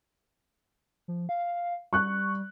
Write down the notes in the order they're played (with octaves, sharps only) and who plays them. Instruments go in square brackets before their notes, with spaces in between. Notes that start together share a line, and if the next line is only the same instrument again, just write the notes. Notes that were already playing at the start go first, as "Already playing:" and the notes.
[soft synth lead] F3
F5
[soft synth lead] G3 [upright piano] C#6 F#6